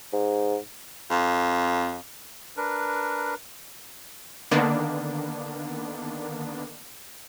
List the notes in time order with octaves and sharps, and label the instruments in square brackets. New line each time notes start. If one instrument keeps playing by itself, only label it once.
[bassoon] G#2
[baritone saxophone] F2
[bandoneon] D4 A#4 B4
[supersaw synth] D3 D#3 A#3 B3 D4